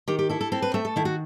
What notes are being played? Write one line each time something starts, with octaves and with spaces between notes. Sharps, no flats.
D#3 G4
G4
E4 A4
A4
C4 A4
B4
A3 E5
A4
D#3 E4
F#4